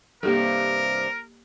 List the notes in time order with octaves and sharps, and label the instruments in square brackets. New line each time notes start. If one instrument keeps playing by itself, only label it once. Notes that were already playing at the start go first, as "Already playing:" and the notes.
[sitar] G2 C3 [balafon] A#3 G4 A4 [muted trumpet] A#4